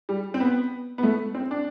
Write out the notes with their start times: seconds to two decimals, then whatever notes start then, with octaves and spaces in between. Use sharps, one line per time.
0.09 G3
0.34 C4
0.40 B3
0.98 B3
1.03 A3
1.35 C4
1.51 D4